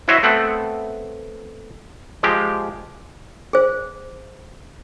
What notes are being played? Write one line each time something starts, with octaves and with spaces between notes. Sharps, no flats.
E4 F#4 C5 C#5 D#5 E5
A3 B3 C4 F#5
F3 G#3 G4
G#4 C5